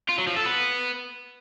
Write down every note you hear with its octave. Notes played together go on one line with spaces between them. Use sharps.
F4
F#3
F3
A4
B3